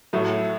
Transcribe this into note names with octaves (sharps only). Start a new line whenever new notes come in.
A2 F#3 A3